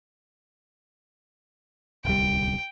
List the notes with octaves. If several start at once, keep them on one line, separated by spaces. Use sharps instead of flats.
D1 C2 G3 G5